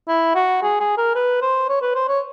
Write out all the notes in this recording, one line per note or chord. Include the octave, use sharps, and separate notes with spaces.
E4
F#4
G#4
G#4
A#4
B4
C5
C#5
B4
C5
C#5